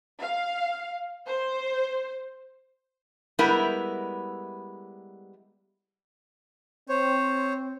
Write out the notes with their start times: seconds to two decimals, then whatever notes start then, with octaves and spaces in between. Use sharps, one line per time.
0.21 F5
1.28 C5
3.39 G3 G#3 B3 E4 A#4
6.89 C4 C5 C#5